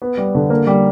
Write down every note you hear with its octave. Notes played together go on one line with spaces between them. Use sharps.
B3
G3
D3
A#3
G3